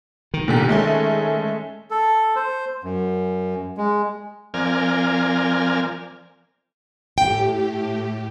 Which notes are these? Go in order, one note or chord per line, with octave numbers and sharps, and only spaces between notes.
D#3
A#2 D3 G4
G#3 A3 C#4
A4
C5
F#2
G#3
F3 C4 A#4 D5 G#5 F6
A2 G4 G5